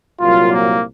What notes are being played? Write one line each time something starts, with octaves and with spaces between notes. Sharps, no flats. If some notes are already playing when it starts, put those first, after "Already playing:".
C2 A#2 F#3 F4
A#3